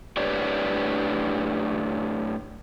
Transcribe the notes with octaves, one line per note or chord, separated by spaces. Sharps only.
A2 D4 G4 B4 C#5 D5